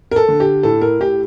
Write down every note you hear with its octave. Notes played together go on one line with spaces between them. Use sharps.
A#4
A4
D3
G4
A2 A4
A#4
A2 G4